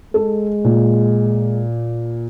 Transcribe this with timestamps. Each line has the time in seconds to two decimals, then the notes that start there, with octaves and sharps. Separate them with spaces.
0.14 G#3 A4
0.64 A#2